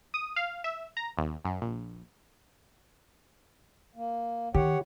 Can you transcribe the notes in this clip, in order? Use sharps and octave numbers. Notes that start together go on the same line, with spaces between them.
D#6
F5
E5
A#5
D#2
F#2
A#1
A#3
D#3 G4 C#5 F#5